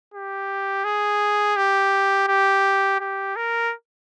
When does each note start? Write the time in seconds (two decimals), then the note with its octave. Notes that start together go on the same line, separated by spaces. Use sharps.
0.14 G4
0.84 G#4
1.57 G4
2.28 G4
3.00 G4
3.36 A#4